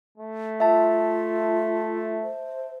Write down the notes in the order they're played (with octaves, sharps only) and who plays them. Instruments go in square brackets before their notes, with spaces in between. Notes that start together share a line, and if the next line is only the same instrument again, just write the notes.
[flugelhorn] A3
[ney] F4 [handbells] E5 A5
[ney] C5